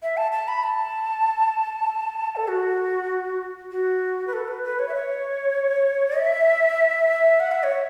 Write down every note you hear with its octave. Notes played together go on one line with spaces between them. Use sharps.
E5
A5
A5
B5
A5
A4
F#4
F#4
B4
A4
B4
B4
C#5
E5
C#5
E5
F#5
E5
C#5